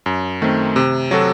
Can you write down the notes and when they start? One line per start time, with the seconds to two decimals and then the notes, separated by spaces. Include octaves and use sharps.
0.06 F#2
0.42 D#3 A3 C4
0.76 C3
1.11 F#3 C4 F#4 A4